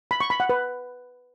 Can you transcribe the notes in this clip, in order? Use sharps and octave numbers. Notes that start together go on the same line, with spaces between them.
B5
C#6
B5
F#5
B4